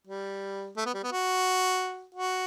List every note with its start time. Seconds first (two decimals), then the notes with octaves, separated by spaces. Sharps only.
0.07 G3
0.77 A3
0.86 B3
0.94 G3
1.03 B3
1.12 F#4
2.15 F#4